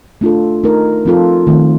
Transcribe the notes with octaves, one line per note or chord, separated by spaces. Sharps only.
A3 D4 F4 A4
A3 D#4 A#4
F3 C4 F4 A4
D#3 A3 C4